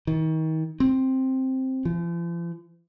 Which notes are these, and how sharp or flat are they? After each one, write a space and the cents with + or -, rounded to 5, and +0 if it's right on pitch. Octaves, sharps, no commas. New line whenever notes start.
D#3 +35
C4 +5
F3 -45